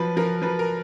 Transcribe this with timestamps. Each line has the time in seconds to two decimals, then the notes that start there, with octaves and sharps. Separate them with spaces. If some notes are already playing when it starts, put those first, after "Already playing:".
Already playing: F3 F#3 B4
0.17 F3 A#4
0.42 F3 B4
0.59 A#4